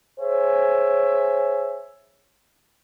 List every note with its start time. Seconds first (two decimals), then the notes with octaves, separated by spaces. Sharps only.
0.19 G#4 C5 C#5 E5 G#5